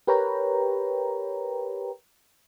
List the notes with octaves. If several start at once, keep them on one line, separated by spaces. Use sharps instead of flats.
G4 A#4 B4 C#5 G5 A#5